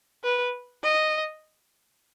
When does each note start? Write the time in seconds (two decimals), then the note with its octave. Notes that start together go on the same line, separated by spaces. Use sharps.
0.24 B4
0.83 D#5